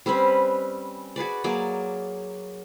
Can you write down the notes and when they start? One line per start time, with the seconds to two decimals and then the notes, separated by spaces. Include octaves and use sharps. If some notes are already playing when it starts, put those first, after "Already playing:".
0.06 G3 C4 C#4 B4
1.16 F#4 G#4 B4 D5
1.44 F#3 A#3 G#4 D5